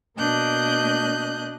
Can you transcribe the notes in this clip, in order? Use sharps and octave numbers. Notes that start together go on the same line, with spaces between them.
B2 A#3 D4 D#5 F#6 G6